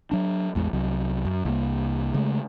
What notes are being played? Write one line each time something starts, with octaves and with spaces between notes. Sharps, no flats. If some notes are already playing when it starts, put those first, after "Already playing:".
F#3 D4
A1 E2 G#3
C2 F#3
F#2
C2 A#3
C#3 G#3 A3